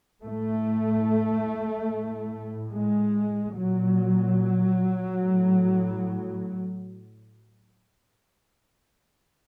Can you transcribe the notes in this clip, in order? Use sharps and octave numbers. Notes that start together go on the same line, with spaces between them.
A2 A3
A2
G#3
A#2 F#3
A2